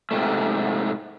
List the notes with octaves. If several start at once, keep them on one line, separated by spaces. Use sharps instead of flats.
G#2 C3 A3